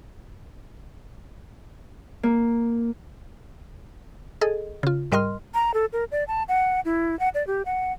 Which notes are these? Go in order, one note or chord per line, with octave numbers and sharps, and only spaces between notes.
A#3
G#4 A4 D#5
C#3 F4
G#2 G3 A#4 D#5 C6 F6
A#5
A4
A#4
D5
A5
F#5
E4
F#5
D5
G4
F#5